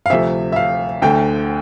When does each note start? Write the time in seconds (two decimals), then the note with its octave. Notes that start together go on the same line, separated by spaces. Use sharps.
0.06 F5
0.10 D2 C3 F3 A3 E5
0.52 E5
0.56 F5
1.02 D2 D3 A3 G5